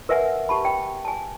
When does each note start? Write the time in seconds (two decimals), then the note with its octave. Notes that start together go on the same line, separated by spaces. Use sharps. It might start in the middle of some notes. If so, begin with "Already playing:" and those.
0.09 A#4 B4 E5 F#5 G#5
0.49 G4 A5 B5
0.65 G5
1.05 G#5 A5